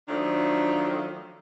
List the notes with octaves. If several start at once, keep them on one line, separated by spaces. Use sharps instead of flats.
D#3 F3 F#3 A3 D4